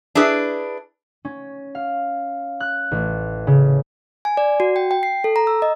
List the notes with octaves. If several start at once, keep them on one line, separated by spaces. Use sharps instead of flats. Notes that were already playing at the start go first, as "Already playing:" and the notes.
D4 E4 G#4 B4
C#4
F5
F#6
A1
C#3
G#5
D5
F#4
G5
G5
C7
A4
A#5
E6
D#5